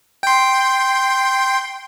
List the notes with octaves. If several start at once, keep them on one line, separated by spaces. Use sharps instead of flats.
G5 C6